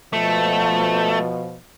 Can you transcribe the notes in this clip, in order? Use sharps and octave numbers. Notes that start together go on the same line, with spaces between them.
B2 F3 A3